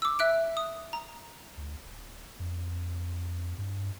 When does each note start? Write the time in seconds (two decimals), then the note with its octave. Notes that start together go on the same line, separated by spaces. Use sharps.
0.02 D6 E6
0.19 E5 F#6 D7
0.57 D#6
0.93 A#5
1.57 D2
1.85 D1
2.39 F2
3.58 G2